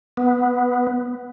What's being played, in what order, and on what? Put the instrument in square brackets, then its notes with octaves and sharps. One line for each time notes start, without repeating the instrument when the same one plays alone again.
[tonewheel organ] B3